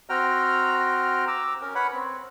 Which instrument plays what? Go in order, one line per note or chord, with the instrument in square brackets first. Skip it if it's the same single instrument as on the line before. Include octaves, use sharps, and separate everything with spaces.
[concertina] C4 F#4 G5 A#5 F6
A#5 D6 E6
C#4 A#4
B4 C#5 F#5 B5
C4